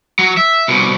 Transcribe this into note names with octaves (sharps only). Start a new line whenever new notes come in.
F#3
E5
C2 B2